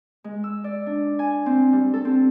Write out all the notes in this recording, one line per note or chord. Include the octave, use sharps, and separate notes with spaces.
G#3
E6
D5
D4
G#5
C4
G3
A4
C4